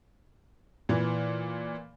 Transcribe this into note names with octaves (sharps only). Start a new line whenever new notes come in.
A#2 E3